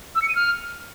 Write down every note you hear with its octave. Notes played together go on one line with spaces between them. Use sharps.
E6
C#7
D#7
F6